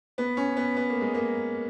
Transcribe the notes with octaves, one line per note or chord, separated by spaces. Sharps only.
B3
C#4
B3
B3
A#3
G#3
A#3